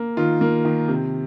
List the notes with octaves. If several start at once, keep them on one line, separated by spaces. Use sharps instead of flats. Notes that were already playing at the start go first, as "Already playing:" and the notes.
Already playing: A#3
D#3 F4
A#3
D#3
C3